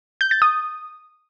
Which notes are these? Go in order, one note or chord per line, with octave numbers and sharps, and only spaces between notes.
G6
A6
D#6